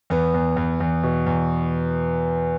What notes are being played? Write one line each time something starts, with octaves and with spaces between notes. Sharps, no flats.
E2 B3
E2
E2
E2
B2
E2